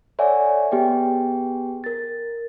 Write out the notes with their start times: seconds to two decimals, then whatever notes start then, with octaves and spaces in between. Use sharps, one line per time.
0.19 A4 C#5 D5 E5 F#5 G#5
0.72 B3 G4 G#4 G5
1.84 A#4 A6